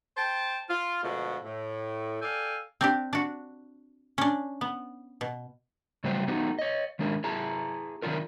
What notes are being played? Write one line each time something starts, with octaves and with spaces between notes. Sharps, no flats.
C5 G5 A5
F4
B2 D3 F3 G#3 A3
A2
A4 D5 F5 G5 G#5
C4 D4 G4
D4 F#4
C#4 D4
B3
B2
C#3 F#3 G3 A3 F#4 C5
B3 D#4 F#4 G4
C#5 D#5
D#3 G#3 D4 A#4
E4 G#4 A5 A#5
D#3 F#3 D4 F4 A#4